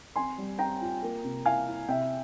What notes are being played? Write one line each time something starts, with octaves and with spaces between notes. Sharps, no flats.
C4 G#5 C6
G3
C4 G5 A#5
F4
A#3
C3
E4 F5 G#5
E4
C3 E5 G5